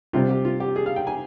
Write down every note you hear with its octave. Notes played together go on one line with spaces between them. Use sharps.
C3 G3 C4 F4
G4
F4
G4
G#4
F5
G5
G#5